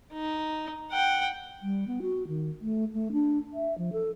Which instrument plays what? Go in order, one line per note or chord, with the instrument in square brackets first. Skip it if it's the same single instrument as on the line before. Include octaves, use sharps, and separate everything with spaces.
[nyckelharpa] D#4
F#5 G5
[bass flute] G3
B3
F#4
D#3
A3
A3
D4
E5
F3
A4